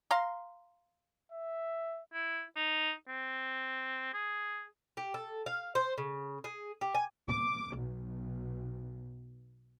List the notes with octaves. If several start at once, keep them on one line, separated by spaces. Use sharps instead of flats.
F5 A#5 C6
E5
E4
D#4
C4
G#4
G4
A4
F5
C5
C#3
G#4
G4
G#5
D6
B1